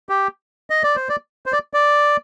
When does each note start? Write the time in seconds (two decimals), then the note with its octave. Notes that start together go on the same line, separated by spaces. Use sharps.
0.09 G4
0.70 D#5
0.83 D5
0.96 C5
1.09 D5
1.46 C5
1.53 D5
1.74 D5